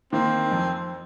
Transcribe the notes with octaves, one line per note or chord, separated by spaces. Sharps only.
D#3 A#3 C4
F2